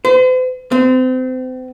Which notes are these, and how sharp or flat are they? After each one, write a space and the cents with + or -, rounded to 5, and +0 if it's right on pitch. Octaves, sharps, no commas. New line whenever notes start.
C5 -45
C4 -35